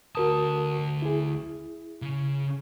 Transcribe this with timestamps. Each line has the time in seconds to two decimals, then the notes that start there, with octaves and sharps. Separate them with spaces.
0.15 D2 F#4 A#4 A5 D#6
1.02 E4 G#4
2.02 C#3